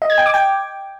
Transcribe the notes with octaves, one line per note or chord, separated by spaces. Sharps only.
D#5
G#6
G5
D6
G5